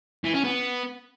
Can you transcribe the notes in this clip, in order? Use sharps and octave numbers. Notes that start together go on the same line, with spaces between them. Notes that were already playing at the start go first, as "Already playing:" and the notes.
E3
C#4
B3